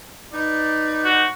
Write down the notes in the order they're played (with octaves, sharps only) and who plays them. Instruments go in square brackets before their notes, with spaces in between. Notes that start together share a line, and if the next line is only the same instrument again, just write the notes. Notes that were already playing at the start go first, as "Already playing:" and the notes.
[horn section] D#4 B4 D5
[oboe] F#4